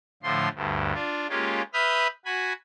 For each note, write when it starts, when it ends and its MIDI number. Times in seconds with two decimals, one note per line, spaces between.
0.23 0.48 45
0.23 0.48 50
0.23 0.48 53
0.23 0.48 84
0.55 0.93 38
0.55 0.93 43
0.94 1.27 62
0.94 1.27 65
1.29 1.62 56
1.29 1.62 58
1.29 1.62 61
1.29 1.62 65
1.29 1.62 67
1.74 2.07 71
1.74 2.07 76
1.74 2.07 83
1.74 2.07 87
1.74 2.07 89
1.74 2.07 91
2.25 2.53 66
2.25 2.53 80
2.25 2.53 83